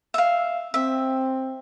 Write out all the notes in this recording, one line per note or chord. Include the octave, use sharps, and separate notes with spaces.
E5 F5
C4 E5